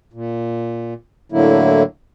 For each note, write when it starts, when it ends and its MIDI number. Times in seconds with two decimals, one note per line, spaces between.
0.13 0.94 46
1.32 1.83 45
1.32 1.83 50
1.32 1.83 54
1.32 1.83 58
1.32 1.83 64